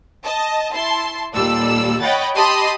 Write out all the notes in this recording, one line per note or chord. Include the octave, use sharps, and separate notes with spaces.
D#5 A5
E4 A5 C6
D#2 A#2 G3 A4 D5 E6
C#5 D#5 F#5 G5 B5 A6
G4 D#5 A5 B5 C6 D#6